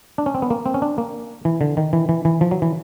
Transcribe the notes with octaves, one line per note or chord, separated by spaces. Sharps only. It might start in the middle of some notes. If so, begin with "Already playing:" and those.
D4
C#4
C4
B3
A#3
C4
C#4
D4
A#3
E3
D3
D#3
E3
E3
E3
F3
F#3
E3